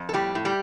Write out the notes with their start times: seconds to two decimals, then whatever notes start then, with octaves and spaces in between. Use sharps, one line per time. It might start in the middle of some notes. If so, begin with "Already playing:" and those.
Already playing: F2
0.09 A4
0.13 A2 G3 G4
0.35 A2
0.45 G3 G4